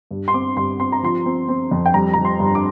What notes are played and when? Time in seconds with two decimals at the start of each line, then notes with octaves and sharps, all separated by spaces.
0.11 G2
0.28 C6
0.34 C4 D6
0.57 G2 C6
0.80 C4 C6
0.92 A#5
1.03 F3 C6
1.26 C4
1.48 C4
1.71 F2
1.86 G5
1.94 G3 A#5
2.14 G3 A#5
2.25 C6
2.40 G2
2.55 D6